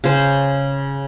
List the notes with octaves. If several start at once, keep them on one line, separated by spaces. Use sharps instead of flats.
C#3 C5